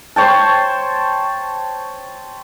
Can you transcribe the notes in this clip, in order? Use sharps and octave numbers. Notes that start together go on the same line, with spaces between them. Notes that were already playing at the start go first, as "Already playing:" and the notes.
C5 C#5 G5 A5